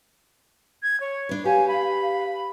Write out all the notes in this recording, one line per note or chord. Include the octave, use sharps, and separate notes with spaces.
G#6
C#5
D4 B4
G4 F5 G#5
F5 B5